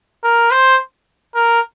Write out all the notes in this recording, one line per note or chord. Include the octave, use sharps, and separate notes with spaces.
A#4
C5
A#4